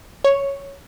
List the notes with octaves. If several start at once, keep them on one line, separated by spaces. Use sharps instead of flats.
C#5